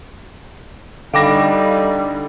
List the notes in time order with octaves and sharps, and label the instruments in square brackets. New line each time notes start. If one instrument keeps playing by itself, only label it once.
[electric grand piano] D3 D6 A#6 [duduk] G3 [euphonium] D#4 [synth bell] F5 G5 B5